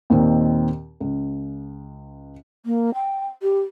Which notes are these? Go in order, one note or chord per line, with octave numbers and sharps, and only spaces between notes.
D#2 A#2 D#3 C4 D#4
C#2
A#3
G5
G4